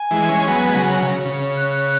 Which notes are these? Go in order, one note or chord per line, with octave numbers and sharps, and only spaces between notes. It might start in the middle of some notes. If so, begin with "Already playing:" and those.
Already playing: G#5
E3 G#3
G#3 C#4
F#3 B3
G#3
C#3 F#3
C#3
C#3
F#6